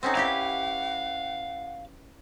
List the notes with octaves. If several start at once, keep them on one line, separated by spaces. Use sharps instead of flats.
C4 C#4 D#4 F#5
E4 G4 B4 F5